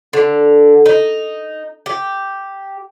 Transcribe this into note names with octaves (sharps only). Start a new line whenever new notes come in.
D3
D#4
G4